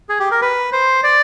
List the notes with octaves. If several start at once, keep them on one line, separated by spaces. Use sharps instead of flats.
G#4
G4
A#4
B4
C5
D5